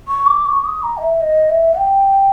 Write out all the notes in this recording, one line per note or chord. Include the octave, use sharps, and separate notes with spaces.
C#6
D6
C#6
D#6
A#5
D#5
E5
D#5
E5
G5